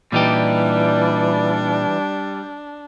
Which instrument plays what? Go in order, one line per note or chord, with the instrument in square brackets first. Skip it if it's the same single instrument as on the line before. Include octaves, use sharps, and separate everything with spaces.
[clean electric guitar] A#2 D#4 G4 [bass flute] E3 [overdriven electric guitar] G3 [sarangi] D4